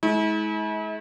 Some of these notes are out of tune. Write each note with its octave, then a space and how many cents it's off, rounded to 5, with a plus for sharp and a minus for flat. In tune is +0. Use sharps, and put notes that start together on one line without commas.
G#3 +40 E4 -40